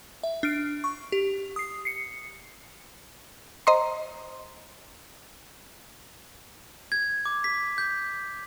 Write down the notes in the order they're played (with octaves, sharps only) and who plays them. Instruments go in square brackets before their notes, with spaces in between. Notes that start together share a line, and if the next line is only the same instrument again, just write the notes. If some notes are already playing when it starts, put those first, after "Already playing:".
[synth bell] E5
D4 F6 D7
C#6
G4
D#6 C7
C7 C#7
[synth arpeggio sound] C5 D#5 A#5 C6
[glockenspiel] G#6
D6
B6
G6